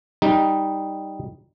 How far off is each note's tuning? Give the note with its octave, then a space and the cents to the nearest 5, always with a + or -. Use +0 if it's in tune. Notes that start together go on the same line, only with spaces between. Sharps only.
G3 +0 D#4 +0